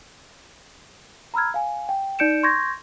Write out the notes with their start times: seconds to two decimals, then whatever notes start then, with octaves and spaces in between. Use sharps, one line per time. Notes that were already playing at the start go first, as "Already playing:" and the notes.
1.34 A#5 B5 E6 F6 G#6
1.54 F5 G#5
1.89 G5
2.19 D#4 D5 G6 C#7 D7 E7
2.43 C6 C#6 G6 G#6 A#6